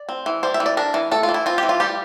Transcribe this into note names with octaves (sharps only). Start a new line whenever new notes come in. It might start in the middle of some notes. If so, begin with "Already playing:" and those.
Already playing: D5
C4
E3
G3 C5
E5
E3
D5
D4 A#4
E3
A3 A4
F4
E3
E4
C4 F4
E3 G4
F4
G3 G4